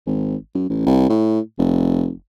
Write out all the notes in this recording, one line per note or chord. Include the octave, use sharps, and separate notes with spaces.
G#1
F#2
A1
C2
A2
F1